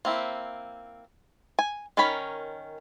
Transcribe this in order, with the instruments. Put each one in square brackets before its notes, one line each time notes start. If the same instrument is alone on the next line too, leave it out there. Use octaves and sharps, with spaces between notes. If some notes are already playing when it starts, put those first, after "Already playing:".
[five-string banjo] A#3 C4 E4
G#5
D#3 C#4 A#4 C#5 B5